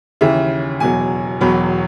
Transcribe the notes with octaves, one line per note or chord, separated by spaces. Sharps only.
D#2 C#3 E3 E5
E1 E2 B2 F#3 G#5
E1 E2 B2 F#3 B5